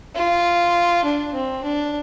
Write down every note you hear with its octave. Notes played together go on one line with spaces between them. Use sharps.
F4
D4
C4
D4